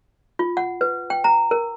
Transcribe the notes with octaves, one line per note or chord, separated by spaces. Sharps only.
F4
F#5
B4
G5
A#5
A#4